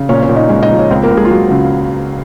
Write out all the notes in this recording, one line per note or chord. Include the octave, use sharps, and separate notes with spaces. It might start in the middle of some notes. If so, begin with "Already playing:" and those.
Already playing: C#3
A#2 C#4 C#5
C#4 C#5
A#2
D#4 D#5
G#3 C#4 C#5
D#4 D#5
F3
C#5
C#2 C4 C5
A#3 A#4
C#2
G#3 G#4
F4
F#3 F#4
C#3